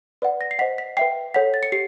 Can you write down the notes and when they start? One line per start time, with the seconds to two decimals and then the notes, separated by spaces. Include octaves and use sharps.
0.22 B4 D5 F#5
0.41 A#6
0.51 C7
0.59 C5 D#5 F#5 B6
0.78 B6
0.97 B4 E5 G5 C7
1.34 A4 C#5 F#5 B6
1.54 A6
1.63 C#7
1.72 G4 C7